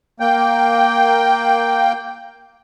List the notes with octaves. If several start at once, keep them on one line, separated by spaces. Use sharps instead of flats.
A#3 G5